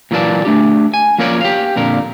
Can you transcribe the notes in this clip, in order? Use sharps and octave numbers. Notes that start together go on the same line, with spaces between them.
A#2 E3 F#3 A#3 D5 A5
A3 D4 G4
G#5
F3 A#3 C#4 A#4 C#5 D5
G4 F5
F2 A#2 D3 A#4